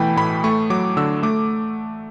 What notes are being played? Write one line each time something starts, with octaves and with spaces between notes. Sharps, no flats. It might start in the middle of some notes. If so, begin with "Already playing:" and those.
Already playing: B2 E3 A3 G5 B5
A2 B5
A3 C#6
F#3 D6
D3 E6
A3 D6